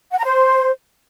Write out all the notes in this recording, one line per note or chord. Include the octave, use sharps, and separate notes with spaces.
F#5
A#5
C5